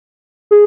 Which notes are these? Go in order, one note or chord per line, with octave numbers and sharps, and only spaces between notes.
G#4